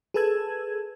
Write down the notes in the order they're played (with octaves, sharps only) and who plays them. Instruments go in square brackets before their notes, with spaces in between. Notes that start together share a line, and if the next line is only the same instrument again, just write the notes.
[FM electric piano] G#4 A4 B4 A5 E6 G#6